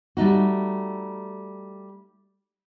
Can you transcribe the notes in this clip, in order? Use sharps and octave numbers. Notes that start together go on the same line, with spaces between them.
G3 A3 D#4 F#4